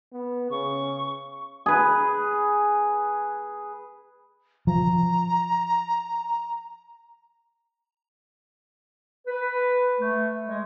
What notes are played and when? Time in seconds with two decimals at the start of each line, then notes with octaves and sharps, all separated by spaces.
0.12 B3
0.50 C#3 C#6
1.66 G#4 B4
4.67 F3 A#5
9.27 B4
9.99 A3
10.46 G#3